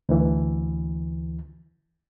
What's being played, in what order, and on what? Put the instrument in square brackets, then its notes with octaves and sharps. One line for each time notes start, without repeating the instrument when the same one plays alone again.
[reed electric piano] D2 E3